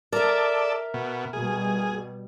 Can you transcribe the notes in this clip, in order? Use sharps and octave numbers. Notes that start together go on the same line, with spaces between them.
A4 A#4 D5 E5
B2
B2 G3 G#4